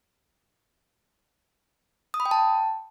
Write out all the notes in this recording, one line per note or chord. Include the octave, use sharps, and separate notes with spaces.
D#6
B5
G5
A5